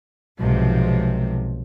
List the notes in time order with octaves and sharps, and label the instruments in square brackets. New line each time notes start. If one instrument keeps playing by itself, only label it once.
[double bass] B1 [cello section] G#2 C3 F3